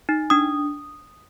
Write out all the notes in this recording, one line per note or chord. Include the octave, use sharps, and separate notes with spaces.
D#4
D4 D#6